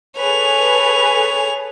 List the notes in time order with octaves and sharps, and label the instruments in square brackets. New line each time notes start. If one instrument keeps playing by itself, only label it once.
[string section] G#4 A4 B4 [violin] C#5 F7